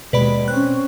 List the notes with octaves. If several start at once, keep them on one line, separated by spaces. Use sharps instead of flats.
D#2 B2 G#3 B4 D5 B5
C4 C#4 F#6